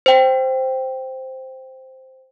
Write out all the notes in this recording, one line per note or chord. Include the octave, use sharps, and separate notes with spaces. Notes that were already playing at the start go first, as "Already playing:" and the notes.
C5 G5